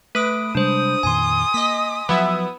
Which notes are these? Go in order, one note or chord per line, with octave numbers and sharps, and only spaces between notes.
A3 B4 D#6 D7
C3 G3 G#3 D4 C5 D#6
F2 A#2 D#3 G#5 C6
A#3 D#5 A#6 B6
F3 F#3 B3 E4 E5